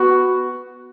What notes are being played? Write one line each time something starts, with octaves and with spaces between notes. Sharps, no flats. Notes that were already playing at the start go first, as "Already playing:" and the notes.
Already playing: B3 F#4